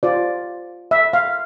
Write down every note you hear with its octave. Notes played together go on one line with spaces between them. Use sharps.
F4 C5 D5
E5
F5